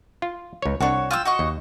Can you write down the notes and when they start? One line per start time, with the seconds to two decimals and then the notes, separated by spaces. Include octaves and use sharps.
0.22 F4
0.62 C#2 C#5
0.81 C2 D4 F#4 C#5
1.11 F4 G5 E6
1.25 F#4 D#5 C#6
1.39 D#2